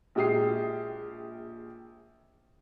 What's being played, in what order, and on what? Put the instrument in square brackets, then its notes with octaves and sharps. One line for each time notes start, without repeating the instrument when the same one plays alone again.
[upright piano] A#1 G#3 G4 D#6 C7